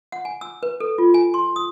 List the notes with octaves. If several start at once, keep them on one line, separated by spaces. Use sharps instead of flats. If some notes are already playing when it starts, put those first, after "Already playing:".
F#5
G#5
E6
B4
A4
F4
G#5
C6
D#6